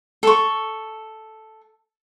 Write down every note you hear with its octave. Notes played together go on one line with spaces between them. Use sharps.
A4 C#6